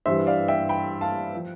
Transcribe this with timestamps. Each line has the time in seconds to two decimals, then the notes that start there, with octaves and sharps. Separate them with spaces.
0.06 G2 E3 G3 C5 E5
0.27 D5 F5
0.48 E5 G5
0.69 G5 B5
1.01 F5 A5
1.35 F3